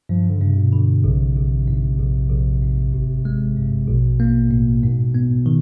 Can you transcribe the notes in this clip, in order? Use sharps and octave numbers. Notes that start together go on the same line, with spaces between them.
G2 F3
D3
G2 C#3
C3
B2
D3
A#1 C3
A#1
G#2
A#1
A#1
G#2
G#1
G#3
G2
A#1 B2
A#3
A2
G#2
B3
D#3